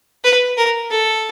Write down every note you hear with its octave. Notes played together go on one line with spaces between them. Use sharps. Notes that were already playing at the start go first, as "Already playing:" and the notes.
B4
A#4
A4